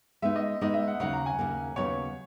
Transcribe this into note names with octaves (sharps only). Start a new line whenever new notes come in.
G#3 B3 D#4 E5
D#5
G#3 B3 D#4 D#5
E5
F#5
D#2 C#3 F#3 A#3 D#4 F#5
A#5
G#5
D#2 C#3 F#3 A#3 D#4
D#2 C#3 F#3 B3 D#4 C#5